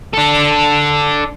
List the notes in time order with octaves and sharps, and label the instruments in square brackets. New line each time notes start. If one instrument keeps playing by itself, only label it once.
[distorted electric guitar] D4 A4